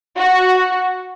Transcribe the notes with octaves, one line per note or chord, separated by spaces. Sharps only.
F#4